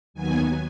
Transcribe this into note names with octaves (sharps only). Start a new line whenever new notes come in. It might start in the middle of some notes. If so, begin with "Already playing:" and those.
D#2 D#3 F#3 B3 G#5